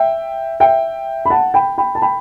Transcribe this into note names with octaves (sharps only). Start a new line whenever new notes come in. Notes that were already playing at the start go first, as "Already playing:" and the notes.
Already playing: E5 G5
E5 G5
B5
F#5 A5
G5 B5
G5 B5
A5
G5 B5